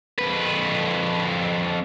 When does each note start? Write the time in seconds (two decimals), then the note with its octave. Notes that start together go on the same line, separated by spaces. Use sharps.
0.19 F2 B4